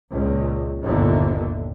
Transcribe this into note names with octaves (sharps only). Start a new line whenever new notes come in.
C#2 A#2
G1 D#2 A#2 D3 E3